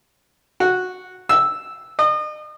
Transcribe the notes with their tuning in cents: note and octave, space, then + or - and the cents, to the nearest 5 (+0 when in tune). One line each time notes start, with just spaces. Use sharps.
F#4 -10
E6 -5
D#5 -40